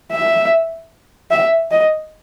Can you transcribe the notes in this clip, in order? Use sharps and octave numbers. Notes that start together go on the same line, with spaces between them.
E5
E5
D#5